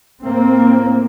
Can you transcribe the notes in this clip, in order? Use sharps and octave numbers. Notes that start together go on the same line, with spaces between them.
A2 A#3 C4